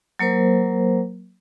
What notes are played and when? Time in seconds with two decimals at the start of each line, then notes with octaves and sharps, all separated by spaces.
0.19 F#3 A#3 A#4 C5